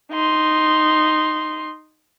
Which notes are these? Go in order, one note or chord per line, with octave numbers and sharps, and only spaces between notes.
D#4 C6